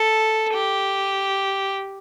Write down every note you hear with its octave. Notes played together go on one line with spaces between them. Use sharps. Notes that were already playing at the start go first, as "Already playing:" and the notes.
Already playing: A4
G4